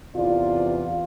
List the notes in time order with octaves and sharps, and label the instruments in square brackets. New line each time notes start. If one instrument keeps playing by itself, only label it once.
[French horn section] E2 C3 E3 F4 D5